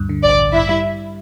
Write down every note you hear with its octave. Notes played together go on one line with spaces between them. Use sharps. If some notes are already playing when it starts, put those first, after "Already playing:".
Already playing: D2 G2
D3
A1 D5
A1
G2 E4 E5
G3